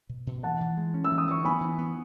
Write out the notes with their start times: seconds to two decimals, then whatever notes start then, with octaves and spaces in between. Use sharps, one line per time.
0.09 B2
0.27 B2
0.43 E3 F#5 A5
0.61 E3
0.77 G#3
0.94 C#4
1.04 E6
1.12 E3
1.18 D#6
1.28 E3 C#6
1.45 B3 G#5 B5
1.61 E3
1.78 B3